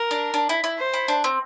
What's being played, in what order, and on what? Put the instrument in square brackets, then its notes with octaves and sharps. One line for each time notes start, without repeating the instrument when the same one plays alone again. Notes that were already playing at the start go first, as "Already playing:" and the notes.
Already playing: [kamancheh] A#4
[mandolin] D4
D4
E4
E4
[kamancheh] C5
[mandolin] E4
D4
C4